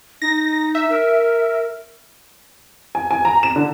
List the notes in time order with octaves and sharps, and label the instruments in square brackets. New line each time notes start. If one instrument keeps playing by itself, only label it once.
[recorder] D#4 [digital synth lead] A#6
[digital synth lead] E5
[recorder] A#4
[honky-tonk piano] G#5
G#5
A#5
E7
D3